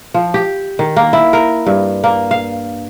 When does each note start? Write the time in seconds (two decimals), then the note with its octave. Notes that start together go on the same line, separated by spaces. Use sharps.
0.14 F3
0.34 G4
0.79 D#3
0.96 A#3
1.13 E4
1.33 A#4
1.66 G2
2.04 A#3
2.31 F5